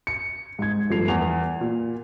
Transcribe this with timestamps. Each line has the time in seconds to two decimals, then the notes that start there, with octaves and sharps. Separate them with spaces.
0.07 C#7
0.59 G#2 G#6
0.90 G1 F3 A3 C7 F7
1.08 E2 G#5 F7
1.61 A#2